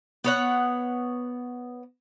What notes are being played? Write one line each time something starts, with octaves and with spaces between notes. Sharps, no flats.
B3 C#5 F#5